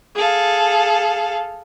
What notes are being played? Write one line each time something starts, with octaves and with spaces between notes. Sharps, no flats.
G#4 A4 F5